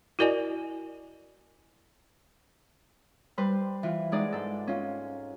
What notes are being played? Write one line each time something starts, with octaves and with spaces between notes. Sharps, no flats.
E4 F#4 A#4 D5 D#5 G#5
G3 B4 C5
E3 F4
G#3 D#4 G#4 D5 F#5
G#2 A4
C#4 F4